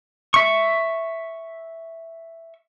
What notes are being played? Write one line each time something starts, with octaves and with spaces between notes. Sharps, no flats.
E5 C#6